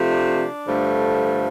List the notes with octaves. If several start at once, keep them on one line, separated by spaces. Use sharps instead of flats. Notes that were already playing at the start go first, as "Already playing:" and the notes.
Already playing: C3 F3 A3
D4
G2 D3 F3 A3